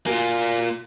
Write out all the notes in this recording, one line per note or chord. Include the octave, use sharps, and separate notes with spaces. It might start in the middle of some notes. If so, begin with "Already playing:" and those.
A#3 F4 F#4 G#5